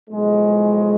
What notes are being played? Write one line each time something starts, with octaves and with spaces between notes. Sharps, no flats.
B1 A2 F3 G#3